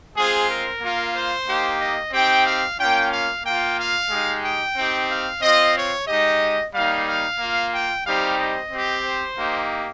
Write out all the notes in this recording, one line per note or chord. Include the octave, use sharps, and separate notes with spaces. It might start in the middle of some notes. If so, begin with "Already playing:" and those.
G#3 C4 F4 G#4
A#4
A#3 F4
C5
A#3 D#4 G4
D#5
C4 D#4 G4 G5
F5
A#3 C#4 F4 G5
F5
A#3 F4 G5
F5
G#3 D#4 G4
G5
C4 D#4 G4
F5
C4 F4 D#5
C#5
G#3 D#4 G4 D#5
G3 A#3 D#4 F5
F5
A#3 F4
G5
G3 C4 D#4 G4 F5
D#5
C4 G4
C5
A#3 D#4 G4